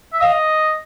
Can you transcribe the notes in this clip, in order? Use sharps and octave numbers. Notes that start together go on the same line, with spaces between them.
E5
D#5 F5